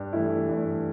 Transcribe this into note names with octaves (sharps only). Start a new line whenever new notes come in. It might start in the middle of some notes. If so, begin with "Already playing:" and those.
Already playing: G2
E3 A3 E4
G2